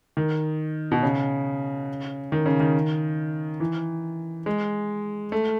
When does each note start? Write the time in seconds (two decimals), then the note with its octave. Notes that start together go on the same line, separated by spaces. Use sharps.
0.17 D#3
0.92 B2
1.03 C#3
2.32 D#3
2.46 C#3
2.60 D#3
3.60 E3
4.46 G#3
5.32 A3